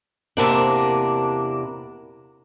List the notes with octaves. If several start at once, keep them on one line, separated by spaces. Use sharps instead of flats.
E2 C3 A#3 D4